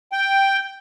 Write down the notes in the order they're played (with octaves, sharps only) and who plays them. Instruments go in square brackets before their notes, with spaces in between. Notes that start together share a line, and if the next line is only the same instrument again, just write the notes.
[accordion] G5